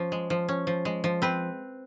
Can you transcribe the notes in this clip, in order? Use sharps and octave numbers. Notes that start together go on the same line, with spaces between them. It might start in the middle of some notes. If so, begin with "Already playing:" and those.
Already playing: F3 C#4
G#3
F3
C#4
F3
G#3
F3
C4 B4